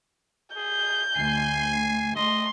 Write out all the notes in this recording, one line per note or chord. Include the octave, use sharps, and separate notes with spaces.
G#4 G6
D2 G#5 C7
A3 D#5 C6